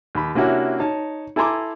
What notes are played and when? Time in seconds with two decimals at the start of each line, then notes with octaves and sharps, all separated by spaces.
0.15 D#2 B5
0.35 C3 A#3 C#4 D4 E4 F#4
0.80 D#4 C#5 A5
1.36 E4 A4 G#5 A#5 C6 D6